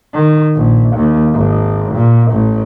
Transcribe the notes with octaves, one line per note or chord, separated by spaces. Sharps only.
D#3
A#1
D#2
G#1
A#2
A1